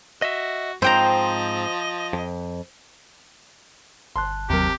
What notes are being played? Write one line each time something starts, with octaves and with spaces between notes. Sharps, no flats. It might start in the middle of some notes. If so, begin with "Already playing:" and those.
F#4 D#5 E5
G#2 F3 C4 C5 D#5 G5 A#5
F2
G1 A5 C6 F#6
D#2 C3 F#3 G4 A#4